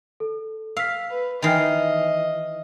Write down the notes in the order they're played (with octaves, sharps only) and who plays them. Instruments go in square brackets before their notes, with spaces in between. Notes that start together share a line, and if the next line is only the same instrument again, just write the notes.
[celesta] A4
[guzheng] F5 [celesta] E6 B6
[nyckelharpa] B4
[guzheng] D#3 E3 [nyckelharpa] D#5 [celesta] F6 C7 F7